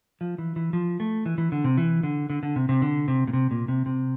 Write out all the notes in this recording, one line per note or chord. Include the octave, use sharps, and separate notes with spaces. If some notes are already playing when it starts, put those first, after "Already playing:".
F3
E3
E3
F3
A3
E3
E3
D3
C3
E3
D3
D3
D3
C3
C3
D3
C3
A#2
C3
A#2
C3
C3